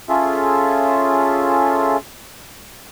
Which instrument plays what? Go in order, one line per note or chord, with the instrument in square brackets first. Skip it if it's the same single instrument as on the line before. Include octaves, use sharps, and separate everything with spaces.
[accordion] C#4 F4 G#4 A4 E5